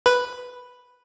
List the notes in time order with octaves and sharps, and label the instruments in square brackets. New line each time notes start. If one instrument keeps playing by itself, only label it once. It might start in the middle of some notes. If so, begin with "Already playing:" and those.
[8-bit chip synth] B4